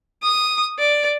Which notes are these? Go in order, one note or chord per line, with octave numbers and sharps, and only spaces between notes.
D#6
D5